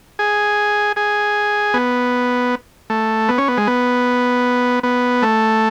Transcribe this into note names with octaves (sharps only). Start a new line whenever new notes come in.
G#4
G#4
B3
A3
B3
C#4
B3
G#3
B3
B3
A3